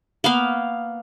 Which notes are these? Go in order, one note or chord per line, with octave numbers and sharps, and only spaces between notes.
A#3 B3 F5